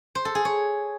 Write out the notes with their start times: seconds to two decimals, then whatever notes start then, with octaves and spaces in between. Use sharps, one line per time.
0.15 C5
0.25 A4
0.35 G#4
0.45 C#5